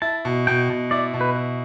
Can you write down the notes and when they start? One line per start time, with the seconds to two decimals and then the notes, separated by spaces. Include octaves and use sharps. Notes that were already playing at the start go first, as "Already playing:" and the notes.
0.02 E4 A5
0.25 B2
0.47 B2 G5
0.69 B2
0.91 E4 D5
1.14 B2
1.21 B4
1.36 E4